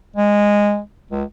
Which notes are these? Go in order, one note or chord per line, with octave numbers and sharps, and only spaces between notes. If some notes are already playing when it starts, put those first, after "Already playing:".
G#3
C#2